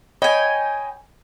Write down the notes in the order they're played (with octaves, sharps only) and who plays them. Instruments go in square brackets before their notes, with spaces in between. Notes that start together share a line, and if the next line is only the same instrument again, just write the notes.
[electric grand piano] C#5 D#5 B5 [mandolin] G5 G#5